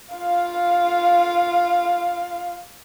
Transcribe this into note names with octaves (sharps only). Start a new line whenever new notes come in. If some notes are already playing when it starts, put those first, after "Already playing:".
F4 F5